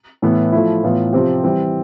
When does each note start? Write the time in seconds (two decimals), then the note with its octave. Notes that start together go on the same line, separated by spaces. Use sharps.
0.22 A2 E3 B3
0.52 F3 A3 E4
0.84 A2 E3 B3 F4
1.13 C3 F3 C4 G4
1.44 E3 G3 C4